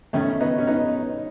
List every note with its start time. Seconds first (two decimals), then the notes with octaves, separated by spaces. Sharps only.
0.13 E2 D#3 A3 C#4
0.40 B3 D#4
0.58 C#4
0.67 B3 D#4